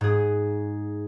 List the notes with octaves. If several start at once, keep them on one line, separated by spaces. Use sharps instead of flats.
G#2 G#4